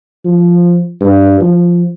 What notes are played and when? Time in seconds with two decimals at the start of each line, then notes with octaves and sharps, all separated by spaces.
0.25 F3
1.01 G2
1.40 F3